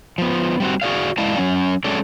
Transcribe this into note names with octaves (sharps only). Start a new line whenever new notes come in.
F3 B3
G3 C4 F#4
F#4 G#4 D5 F5
G#3 E4 D5 F5 A5
F#3 C#4
F#3 G#3 C#4 A4 D5